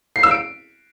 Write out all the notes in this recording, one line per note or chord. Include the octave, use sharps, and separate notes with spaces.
C7
E6
D7